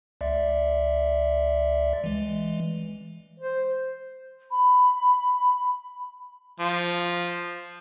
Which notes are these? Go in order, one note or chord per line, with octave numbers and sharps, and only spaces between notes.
C#2 D5 E5
E3 G#3
C5
B5
F3